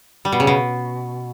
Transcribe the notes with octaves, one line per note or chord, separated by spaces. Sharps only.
G3
B2
C#3
B2